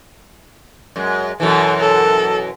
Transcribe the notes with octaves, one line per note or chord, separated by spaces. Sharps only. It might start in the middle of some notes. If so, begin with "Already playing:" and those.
F#2 G#3
F#2 B2 E3 A4
A4